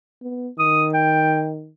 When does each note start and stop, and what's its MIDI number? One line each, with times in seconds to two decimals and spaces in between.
0.22 0.50 59
0.59 1.70 51
0.59 0.86 87
0.94 1.48 79